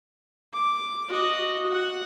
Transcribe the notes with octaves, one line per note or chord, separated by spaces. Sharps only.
D6
F#4 D#5
F#4 F#5